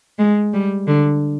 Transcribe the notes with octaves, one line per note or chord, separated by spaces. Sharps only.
G#3
G3
D3